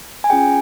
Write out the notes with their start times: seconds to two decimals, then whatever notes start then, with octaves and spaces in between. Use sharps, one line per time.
0.24 G#5
0.30 C#4 F4 G#4 G5